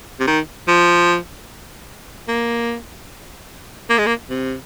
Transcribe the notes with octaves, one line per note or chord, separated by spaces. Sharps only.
C3
D#3
F3
A#3
A#3
G#3
A#3
C3